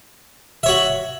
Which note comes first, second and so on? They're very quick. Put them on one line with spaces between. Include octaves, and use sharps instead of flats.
E5 C#5 F#4